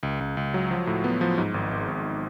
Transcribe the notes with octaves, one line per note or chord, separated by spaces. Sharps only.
C#2
C#2
C#2
F#3
F3
A2
B3
F3
G#2
G#1
G#1
G#1